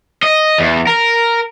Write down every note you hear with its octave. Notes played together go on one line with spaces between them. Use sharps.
D#5
E2
A#4